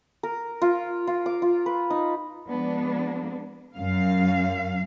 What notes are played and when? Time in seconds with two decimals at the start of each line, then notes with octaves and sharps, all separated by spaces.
0.23 A#4
0.62 F4
1.07 F4
1.26 D6
1.42 F4
1.66 B4
1.90 D#4
2.47 F3 G#3 B3 D4
3.75 F#2 F5